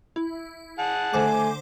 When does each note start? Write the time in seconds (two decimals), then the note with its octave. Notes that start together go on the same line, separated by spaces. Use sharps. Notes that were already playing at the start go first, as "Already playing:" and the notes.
0.16 E4
0.79 G#4 F#5 A5
1.13 D3 A3 C5 G#5 D6